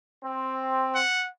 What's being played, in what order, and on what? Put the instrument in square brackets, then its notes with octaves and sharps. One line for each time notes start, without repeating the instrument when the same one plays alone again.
[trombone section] C4
[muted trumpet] F#5